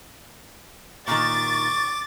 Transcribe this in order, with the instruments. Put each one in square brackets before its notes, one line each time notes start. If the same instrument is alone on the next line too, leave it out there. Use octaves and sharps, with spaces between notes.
[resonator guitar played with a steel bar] A#2 D#3 [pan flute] C#6 [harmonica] D6 [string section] A6